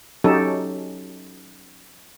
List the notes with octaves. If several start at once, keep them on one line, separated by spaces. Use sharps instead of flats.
F#3 C#4 D#4 G4 A4